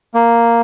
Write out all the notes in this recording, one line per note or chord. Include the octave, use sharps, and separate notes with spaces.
A#3